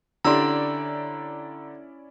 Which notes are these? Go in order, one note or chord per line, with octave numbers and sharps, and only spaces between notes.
D3 C#4 E4 G4 D5 A#5 C6 E6